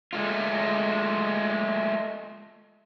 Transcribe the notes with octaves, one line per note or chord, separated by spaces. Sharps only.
G#3 A3 F4